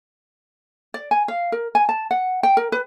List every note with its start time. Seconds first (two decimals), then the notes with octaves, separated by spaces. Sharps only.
0.94 D5
1.11 G#5
1.28 F5
1.52 A#4
1.75 G#5
1.89 A5
2.11 F#5
2.43 G5
2.57 A#4
2.72 B4